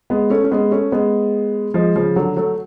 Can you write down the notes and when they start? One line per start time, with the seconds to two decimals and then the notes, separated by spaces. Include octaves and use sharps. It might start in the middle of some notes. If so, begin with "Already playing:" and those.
0.10 G#3 B3
0.30 A3 C#4
0.44 C#4
0.51 G#3 B3
0.71 A3 C#4
0.92 G#3 B3
1.74 F3 G#3
1.96 C#3 F3
2.16 D3 F#3
2.37 F#3 A3